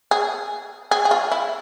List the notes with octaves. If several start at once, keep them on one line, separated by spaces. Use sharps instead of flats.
G#4
G#4
G#4
F4
E4